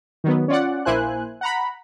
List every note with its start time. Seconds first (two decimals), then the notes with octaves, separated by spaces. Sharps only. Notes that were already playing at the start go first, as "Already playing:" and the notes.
0.24 D#3 F#3 B3
0.48 C#4 F4 D5 F#5
0.85 A#1 A#3 E4 C5 G#5 F#6
1.41 F#5 A#5 B5